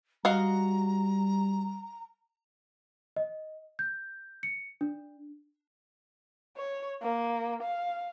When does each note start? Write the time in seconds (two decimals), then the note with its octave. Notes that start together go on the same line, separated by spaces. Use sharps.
0.25 G3 F#4 D#5 F5 A#5
3.17 D#5
3.79 G6
4.43 C#7
4.81 D4
6.57 C#5
7.02 A#3
7.63 F5